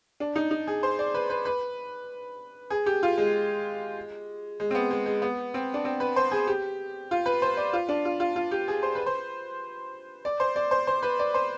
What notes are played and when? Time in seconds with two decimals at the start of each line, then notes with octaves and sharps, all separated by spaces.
0.20 D4
0.36 D#4
0.51 D#4
0.67 G#4
0.83 C5
0.99 D5
1.14 B4
1.30 B4
1.45 B4
2.70 G#4
2.86 G4
3.03 F4
3.17 G#3
4.60 G#3
4.71 C4
4.75 B3
4.90 G#3
5.06 G#3
5.22 B3
5.54 C4
5.74 D4
5.85 C4
6.00 B4
6.16 C5
6.32 G#4
6.47 G4
7.11 F4
7.26 B4
7.42 C5
7.57 D5
7.73 F4
7.89 D4
8.05 F4
8.20 F4
8.36 F4
8.51 G4
8.68 G#4
8.83 C5
8.95 B4
9.06 C5
10.25 D5
10.40 C5
10.56 D5
10.71 C5
10.87 C5
11.03 B4
11.19 D5
11.34 C5